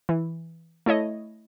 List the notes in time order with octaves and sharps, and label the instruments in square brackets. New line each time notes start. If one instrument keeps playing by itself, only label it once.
[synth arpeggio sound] E3
A3 E4 C#5 D#5